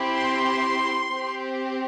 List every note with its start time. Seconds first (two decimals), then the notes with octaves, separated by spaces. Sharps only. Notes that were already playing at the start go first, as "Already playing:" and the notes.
Already playing: C4 E4 G4
0.15 C6
1.14 C4 G4